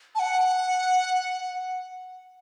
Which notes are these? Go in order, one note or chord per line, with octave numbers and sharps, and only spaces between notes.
A5
F#5